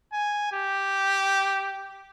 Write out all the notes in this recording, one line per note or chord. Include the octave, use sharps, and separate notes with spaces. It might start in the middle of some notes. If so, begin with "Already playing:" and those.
G#5
G4